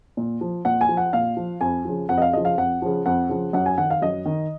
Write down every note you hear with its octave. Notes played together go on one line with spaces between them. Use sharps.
A#2
F3
A#2 F#5
G#5
F3
F#5
A#2 F5
F3
F2 G#5
C#3 F3
F2 F#5
D#5
F5
C#3 F3 D#5
F5
F2 F#5
C#3 F3
F2 F#5
C#3 F3
F#2 F#5
G#5
D#3 F#5
F5
F#2 D#5
D#3